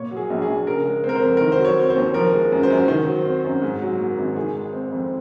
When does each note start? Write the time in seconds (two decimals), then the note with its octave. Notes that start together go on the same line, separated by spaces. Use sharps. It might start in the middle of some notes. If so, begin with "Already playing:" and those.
Already playing: A#2 C#5
0.11 F#3
0.17 G#4
0.30 A#1
0.42 G#4
0.48 A#1
0.67 C#3 A#4
0.86 G#3
1.04 C4
1.09 A#4
1.15 C5
1.22 F2
1.37 D#3 A#4
1.52 C5
1.59 F#3
1.65 C#5
1.77 C4
1.90 C5
1.96 D#2
2.14 F3 A#4
2.34 G#3
2.52 F#2
2.63 C5
2.70 F#2
2.88 D#3 C5
3.07 F#3
3.25 C4
3.44 F#2
3.62 G#2
3.82 F#3
3.99 A#3
4.18 G#1
4.36 D#3 G#4
4.55 G#3
4.73 C4
4.92 F2